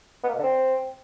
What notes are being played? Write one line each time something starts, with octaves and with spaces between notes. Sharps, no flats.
B3
A#3
B2
D3
C4